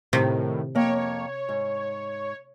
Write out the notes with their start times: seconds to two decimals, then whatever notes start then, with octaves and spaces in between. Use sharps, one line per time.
0.13 A2 C3 D#3
0.75 F2 A#3 C#5 G5
1.49 G#2